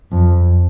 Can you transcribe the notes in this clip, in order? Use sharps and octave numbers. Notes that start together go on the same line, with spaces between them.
F2